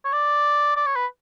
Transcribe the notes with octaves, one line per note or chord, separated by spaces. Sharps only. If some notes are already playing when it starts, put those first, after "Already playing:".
C#5
D5
D5
C#5
B4